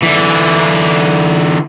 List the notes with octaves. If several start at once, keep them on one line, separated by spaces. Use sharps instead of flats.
D3 E3